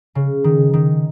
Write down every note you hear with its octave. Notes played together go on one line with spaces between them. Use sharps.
C#3
D#3
D#3